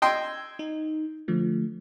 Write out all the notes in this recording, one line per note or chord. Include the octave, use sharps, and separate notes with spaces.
D#5 G5 C6 E6 G#6
D#4
D3 F3 A3